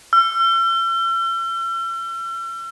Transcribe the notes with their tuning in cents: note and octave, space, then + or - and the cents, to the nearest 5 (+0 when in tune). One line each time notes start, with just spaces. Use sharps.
E6 +45